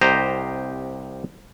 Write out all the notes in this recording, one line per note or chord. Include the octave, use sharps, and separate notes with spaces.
C2 G4 C5 D#5 A#5